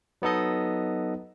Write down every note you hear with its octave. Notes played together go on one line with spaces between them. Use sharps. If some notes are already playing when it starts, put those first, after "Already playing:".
F#3 B3 D#4 A4 D#5